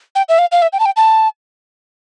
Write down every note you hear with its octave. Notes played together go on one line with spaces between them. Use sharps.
G5
E5
F5
F5
E5
G5
A5
G5
A5